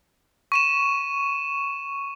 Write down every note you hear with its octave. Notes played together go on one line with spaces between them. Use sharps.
C#6 D#7 E7